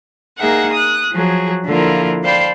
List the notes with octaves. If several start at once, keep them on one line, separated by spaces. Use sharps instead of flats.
A#3 D#4 G#4 A#4 E5 F#5
D#6 F#6
F3 F#3 G#4
D3 F3 A#3 E4 F4 A#4
C5 D5 F5 G5 A5 B5